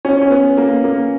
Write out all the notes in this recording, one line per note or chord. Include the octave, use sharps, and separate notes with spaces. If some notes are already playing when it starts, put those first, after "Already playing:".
C#4
C#4
B3
A#3
A#3